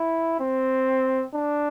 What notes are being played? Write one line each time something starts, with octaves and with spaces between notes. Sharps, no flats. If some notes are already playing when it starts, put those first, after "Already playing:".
Already playing: E4
C4
D4